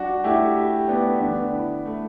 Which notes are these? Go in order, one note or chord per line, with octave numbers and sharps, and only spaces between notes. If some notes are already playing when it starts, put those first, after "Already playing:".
Already playing: G3 D4 F#4
A3 E4 G4
G4
A3 B3 D4
D3 B3 D4
E4
A3